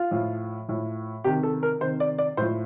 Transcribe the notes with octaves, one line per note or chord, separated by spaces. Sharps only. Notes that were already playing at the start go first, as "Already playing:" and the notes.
Already playing: F4
A2 F3
A2 F3
C3 D#3 G4
A4
A#4
C3 D#3 C5
D5
D5
A2 F3 C5